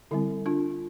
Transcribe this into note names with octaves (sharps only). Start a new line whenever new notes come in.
D3 G3 C4 E4
D4 F4